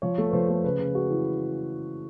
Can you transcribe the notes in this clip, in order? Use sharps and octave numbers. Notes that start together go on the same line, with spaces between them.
F3 C#5
A3
B4
F3 C5
A3
C#3 B4
C#3
G#3 F#4
E3